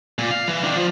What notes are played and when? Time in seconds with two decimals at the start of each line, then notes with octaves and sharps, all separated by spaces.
0.19 A#2
0.31 F5
0.48 E3
0.64 D#3 D4
0.75 F3